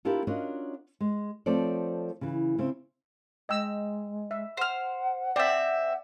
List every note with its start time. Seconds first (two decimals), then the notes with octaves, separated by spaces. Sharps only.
0.05 B3 D4 E4 F4 G4 A#4
0.27 C#4 D4 F4 F#4 A#4 D#5
1.01 G#3
1.46 F3 A3 C4 A4 C#5 D5
2.21 C#3 E3
2.58 C#3 C4 E5
3.49 G#3 D#5 G5 E6
4.31 E5
4.57 C5 F#5 F6
5.36 C4 D5 E5 G5